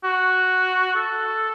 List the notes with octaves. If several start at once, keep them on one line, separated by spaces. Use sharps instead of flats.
F#4
A4